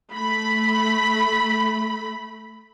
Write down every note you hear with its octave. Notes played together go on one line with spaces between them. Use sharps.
A3 B5